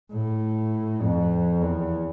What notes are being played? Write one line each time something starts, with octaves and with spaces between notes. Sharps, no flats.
A2
F2
E2